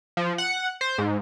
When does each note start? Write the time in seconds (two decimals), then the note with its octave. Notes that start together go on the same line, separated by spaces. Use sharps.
0.17 F3
0.38 F#5
0.81 C5
0.98 G#2